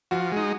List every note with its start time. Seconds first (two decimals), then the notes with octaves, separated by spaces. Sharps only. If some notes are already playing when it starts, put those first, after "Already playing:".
0.11 F3 F#4
0.32 G#3 D#4